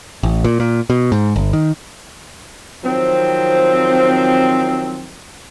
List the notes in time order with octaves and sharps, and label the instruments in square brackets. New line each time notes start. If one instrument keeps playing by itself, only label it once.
[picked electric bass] A1
A#2
A#2
B2
G#2
G1
D#3
[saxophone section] D#3 F3 F#3 C4